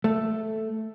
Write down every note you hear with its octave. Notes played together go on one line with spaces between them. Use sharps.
A3